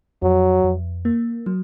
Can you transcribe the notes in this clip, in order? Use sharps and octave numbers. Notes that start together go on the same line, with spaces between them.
F2 F#3
F2
A#3
F#3